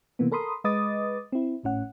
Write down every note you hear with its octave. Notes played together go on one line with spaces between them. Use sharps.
C3 E3 A#3 B3
A4 A#4 B5 C6 D#6
G#3 B4 D#5 D6 D#6 A6
C4 E4
G#1 A2 C#4 F#5